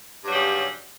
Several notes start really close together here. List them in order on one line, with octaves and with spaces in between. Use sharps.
G2 F#3 G3 C#3